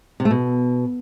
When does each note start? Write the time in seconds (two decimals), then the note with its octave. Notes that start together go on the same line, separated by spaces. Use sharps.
0.20 C3
0.25 A3
0.31 B2